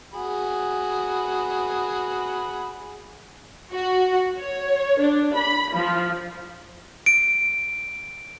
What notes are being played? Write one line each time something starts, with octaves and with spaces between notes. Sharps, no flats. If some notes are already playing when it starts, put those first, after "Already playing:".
F#4 G#4 B5
F#4
C#5
D4
B5
F3
D7